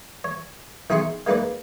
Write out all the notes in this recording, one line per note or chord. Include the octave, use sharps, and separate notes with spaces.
C#5
B1 D#4 G#4 E5 C6 C#6
G#3 A#3 D#4 B4 D5